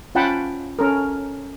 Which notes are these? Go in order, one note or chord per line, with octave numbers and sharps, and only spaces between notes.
C#4 F4 F#5 G5 A5 B5
C#4 A4 A#4